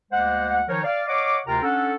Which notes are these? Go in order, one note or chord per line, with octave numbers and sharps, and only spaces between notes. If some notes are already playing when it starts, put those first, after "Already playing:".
D2 G#3 A#3 C5 F#5
D#3 F3 D#4 A#4 C#5
D5 F5
C#5 D#5 F5 F#5 D6
D2 C3 F4 A#4 G5 A#5
C#4 D4 A4 F#5